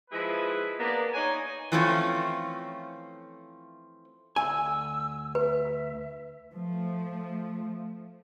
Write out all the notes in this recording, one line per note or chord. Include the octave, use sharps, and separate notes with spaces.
F3 G#3 E4 G#4 B4
A#3 B3 D4
D#4 C#5 D5 G#5
E3 F3 A3 C4 C#4 F4
D2 G#5 E6
B4 E5
F3 A3